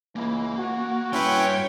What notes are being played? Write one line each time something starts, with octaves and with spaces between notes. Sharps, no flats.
C#2 E3 A#3
F#4
G2 C#4 E4 B4 C#5 G5 C6